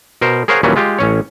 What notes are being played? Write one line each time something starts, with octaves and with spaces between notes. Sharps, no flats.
B2 A#4 C5
G#4 A#4 C5 C#5 F5 F#5
D#2 A#2 E3 F#3 G3 C#4
G#3 F4 G4
A1 C#4 C#5